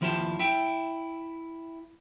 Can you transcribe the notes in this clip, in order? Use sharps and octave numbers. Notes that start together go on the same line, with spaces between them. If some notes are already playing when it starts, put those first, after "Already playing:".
D#2 F3 E4 G4 C5 A5
E4 E5 G5